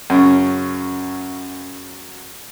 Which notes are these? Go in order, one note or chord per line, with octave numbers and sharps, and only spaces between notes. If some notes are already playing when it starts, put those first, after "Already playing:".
F#2 C#3